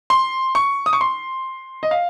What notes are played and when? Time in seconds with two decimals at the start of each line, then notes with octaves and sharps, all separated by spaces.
0.10 C6
0.55 C#6
0.86 D#6
0.93 C#6
1.01 C6
1.83 D#5
1.91 F5